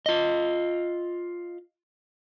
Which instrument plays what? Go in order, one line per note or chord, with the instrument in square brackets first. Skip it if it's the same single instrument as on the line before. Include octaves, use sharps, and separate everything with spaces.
[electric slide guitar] F4 D#5